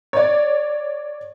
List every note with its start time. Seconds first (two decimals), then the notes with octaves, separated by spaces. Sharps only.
0.13 C#5 D5